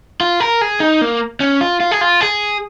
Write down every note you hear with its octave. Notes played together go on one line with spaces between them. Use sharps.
F4
A#4
G#4
D#4
A#3
C#4
F4
F4
G#4
F4
G#4